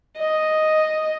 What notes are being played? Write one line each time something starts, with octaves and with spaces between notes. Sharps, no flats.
D#5